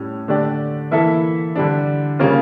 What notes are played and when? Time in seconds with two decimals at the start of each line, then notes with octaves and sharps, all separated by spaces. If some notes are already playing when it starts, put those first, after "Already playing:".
Already playing: A2 G3 C#4
0.28 D3 A3 D4 G4 D5
0.91 E3 A#3 E4 A4 E5
1.56 D3 G3 D4
2.19 C#3 G3 A#3 C#4 F4